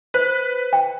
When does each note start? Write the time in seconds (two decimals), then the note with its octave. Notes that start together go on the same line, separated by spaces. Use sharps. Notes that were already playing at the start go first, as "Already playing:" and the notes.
0.14 B4 C5
0.73 G5